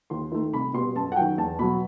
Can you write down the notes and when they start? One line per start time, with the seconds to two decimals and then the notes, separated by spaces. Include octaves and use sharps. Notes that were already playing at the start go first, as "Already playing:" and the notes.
0.10 D#2 C6
0.32 D#3 A3
0.53 C2 B5
0.73 B2 G3 B3 C6
0.95 F#2 A5
1.12 F#5
1.16 D#3 F#3 G5
1.38 E2 A5
1.59 B2 F#3 B5